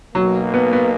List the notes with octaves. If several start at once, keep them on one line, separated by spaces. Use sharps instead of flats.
B1 B2 F#3 A#3
B3
B3